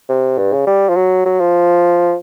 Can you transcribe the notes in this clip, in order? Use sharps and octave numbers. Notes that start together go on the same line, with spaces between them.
C3
G2
C#3
G3
F3
F#3
F#3
F3